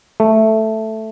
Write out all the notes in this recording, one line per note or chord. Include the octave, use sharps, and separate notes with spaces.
A3